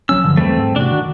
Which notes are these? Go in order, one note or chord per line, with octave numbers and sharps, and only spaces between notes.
A#1 F#3 C#4 E6
G2 D3 F3
E2 E3 G3 A3 C4
G#2
E1 C3 D4 F#4
D#3